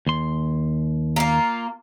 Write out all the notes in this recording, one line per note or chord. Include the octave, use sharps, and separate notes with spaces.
D#2 C6
A#3 F4